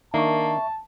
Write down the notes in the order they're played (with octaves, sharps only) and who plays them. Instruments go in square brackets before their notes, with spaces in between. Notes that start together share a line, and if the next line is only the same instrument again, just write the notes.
[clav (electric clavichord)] D#3 D4 [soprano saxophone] A#3 [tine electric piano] E5 C#6 [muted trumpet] A5